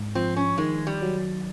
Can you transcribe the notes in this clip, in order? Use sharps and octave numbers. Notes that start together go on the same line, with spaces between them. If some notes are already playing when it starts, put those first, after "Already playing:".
Already playing: G#2
F3 C4
C#4
D#3 G#3
G3
F#3